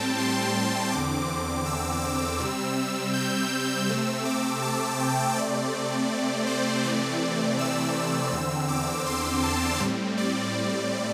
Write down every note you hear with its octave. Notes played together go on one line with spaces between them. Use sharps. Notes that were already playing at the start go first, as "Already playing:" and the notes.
Already playing: A2 G3 C4 G5 A5
C6
E2 D3 C4 D6
E6
E6
C3 G3 C4 E6
E6
G6
C3 A3 C4 E6
D6
A5
G5
C3 A3 C4 D5
C5
C3 E3 A3 C4 D5
E6
E2 D3 C4 E6
D6
C6
A5
A2 G3 C4
D5